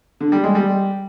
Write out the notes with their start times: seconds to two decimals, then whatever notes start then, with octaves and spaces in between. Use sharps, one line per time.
0.21 D3
0.32 G3
0.44 G#3
0.55 G3